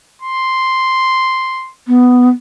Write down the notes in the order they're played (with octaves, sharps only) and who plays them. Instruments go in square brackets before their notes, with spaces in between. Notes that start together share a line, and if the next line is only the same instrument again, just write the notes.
[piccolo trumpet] C6
[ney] B3